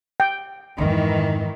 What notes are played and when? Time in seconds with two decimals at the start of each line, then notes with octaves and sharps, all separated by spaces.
0.20 G5
0.78 F2 G#2 D#3 E3